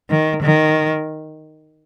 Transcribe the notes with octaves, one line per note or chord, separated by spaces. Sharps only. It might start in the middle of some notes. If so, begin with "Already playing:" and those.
D#3
D#3